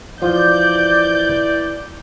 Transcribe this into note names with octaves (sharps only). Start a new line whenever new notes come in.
E3 F3 F4 D5 G6